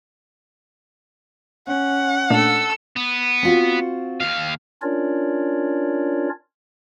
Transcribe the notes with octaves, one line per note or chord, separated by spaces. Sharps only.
C#4 F#5
A#2 A3 D4 A4 E6
B3
C4 F4 F#4
D#2 F5
C#4 D4 F4 A#4 C#5 D5